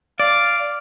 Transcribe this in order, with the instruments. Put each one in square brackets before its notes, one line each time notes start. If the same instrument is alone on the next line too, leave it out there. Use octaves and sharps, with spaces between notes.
[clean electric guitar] D5 [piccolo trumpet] F5